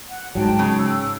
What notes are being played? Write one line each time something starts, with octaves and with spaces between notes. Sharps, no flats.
F#5
G#2 F#3 G5 A5
C#3
E6